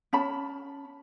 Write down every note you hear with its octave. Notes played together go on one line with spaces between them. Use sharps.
C#4 A5 B5